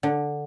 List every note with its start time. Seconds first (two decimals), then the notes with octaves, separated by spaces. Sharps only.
0.03 D3